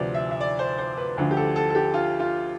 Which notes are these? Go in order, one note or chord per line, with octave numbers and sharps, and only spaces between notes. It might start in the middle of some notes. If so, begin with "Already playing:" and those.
Already playing: D2 C3 F3 B4 D5
E5
E5
D5
C5
C5
B4
D2 D3 F3 B4
G4
A4
A4
A4
G4
F4
F4